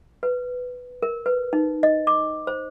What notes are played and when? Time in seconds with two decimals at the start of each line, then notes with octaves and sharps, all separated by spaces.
0.23 B4
1.03 A#4
1.26 B4
1.53 D#4
1.83 D#5
2.07 D6
2.47 C5